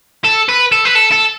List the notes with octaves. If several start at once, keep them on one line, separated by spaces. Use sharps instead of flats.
A4
B4
A4
B4
A4
A4